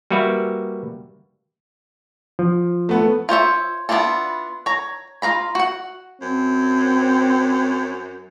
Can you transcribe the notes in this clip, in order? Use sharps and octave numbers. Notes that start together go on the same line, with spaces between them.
G3 A#3 F#4 B4 E5 F5
F3
A3 B3
F4 C5 C#5 E5
B3 D4 E4 F4 A4
C#5 A#5
F4 F5 A#5 B5
F#4 F#5
F#2 C4